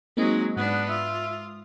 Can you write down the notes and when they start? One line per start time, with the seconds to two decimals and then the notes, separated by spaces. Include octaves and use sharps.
0.17 F#3 G#3 A#3 C4 D#4
0.57 G#2 B3 D4 F#5 D#6
0.89 F4 E5